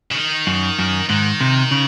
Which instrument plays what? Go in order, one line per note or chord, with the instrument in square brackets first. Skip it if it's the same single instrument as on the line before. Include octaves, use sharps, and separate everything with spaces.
[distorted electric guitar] C#3
D#3
[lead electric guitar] F#2
F#2
[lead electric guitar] G#2 [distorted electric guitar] D#3
[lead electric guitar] C3
C#3